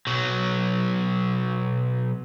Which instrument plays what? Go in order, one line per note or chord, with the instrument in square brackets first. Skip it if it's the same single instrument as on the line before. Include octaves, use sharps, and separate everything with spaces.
[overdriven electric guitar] B1 F#3